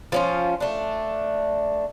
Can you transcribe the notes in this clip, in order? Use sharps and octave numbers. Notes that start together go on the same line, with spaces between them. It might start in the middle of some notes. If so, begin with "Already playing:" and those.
F3 C#4 F4
A3 D4